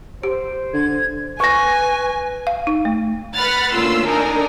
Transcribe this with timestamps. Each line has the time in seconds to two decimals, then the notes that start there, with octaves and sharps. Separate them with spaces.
0.23 G4 C5
0.73 D3 G#6
1.40 B4 G#5 C#6 A#6
2.47 F5
2.67 D#4
2.85 A3
3.35 B4 F#5 B5 F6 A6
3.73 D2 A#3 C#4 F4 C6 E6
4.06 D4 D#4 A4 A#4 G#5 A#5